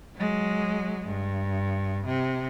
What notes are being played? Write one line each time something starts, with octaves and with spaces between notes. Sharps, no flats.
F#3 G#3
G2
C3